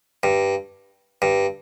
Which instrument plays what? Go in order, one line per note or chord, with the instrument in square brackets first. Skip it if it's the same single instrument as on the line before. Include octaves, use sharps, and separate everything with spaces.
[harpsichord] G2
G2